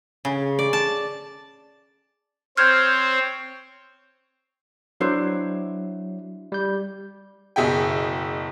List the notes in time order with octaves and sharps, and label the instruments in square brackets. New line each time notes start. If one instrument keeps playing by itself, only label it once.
[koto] C#3
D5
A5
[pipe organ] C4 C5 C#5 [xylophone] F6 G6 G#6
[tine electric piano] F#3 [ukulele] D4 E4 C5
[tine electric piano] G3 G6
[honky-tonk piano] F#1 B2 G#4 E5 G5